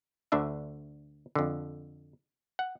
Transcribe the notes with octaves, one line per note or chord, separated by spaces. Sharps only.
D2 D3 D4 E5
F2 D3
F#5